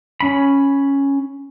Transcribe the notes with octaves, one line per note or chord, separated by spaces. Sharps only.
C#4 B5